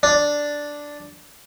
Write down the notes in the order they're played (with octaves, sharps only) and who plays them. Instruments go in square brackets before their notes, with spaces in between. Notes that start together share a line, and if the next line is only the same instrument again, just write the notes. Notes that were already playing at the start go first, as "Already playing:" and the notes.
[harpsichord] D4